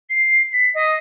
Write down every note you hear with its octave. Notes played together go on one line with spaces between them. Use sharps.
C7
B6
D#5